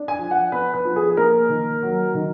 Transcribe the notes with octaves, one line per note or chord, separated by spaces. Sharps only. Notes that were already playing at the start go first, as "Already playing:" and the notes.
Already playing: D4
G#5
F3
F#5
B3 B4
B4
F3
G#4
G#4
A#3 A#4
D#3
F#3
D#3